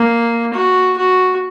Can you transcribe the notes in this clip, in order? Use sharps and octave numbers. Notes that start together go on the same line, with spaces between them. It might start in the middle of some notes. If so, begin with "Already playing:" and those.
Already playing: A#3
F#4
F#4